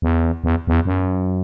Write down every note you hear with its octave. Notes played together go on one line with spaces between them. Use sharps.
E2
E2
E2
F#2